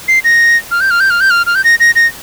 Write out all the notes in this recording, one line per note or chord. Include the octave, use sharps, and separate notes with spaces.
C7
A#6
F6
G6
F6
G6
F6
G6
F6
F6
G6
A#6
A#6
A#6